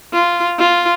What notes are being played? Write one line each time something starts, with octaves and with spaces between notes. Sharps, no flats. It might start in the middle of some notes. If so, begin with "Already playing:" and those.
F4
F4